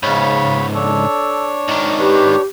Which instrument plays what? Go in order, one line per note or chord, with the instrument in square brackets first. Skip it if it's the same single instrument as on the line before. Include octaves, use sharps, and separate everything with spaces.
[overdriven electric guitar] C#2 G#2 [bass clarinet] C#3 [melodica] C#5 B5
[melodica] D4 C#5 [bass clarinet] A4
[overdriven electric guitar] G#2 D#3
[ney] G4 [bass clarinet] B4